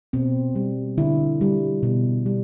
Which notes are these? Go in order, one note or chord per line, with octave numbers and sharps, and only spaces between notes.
B2 C4
G3
D3 E4
G3
B2
G3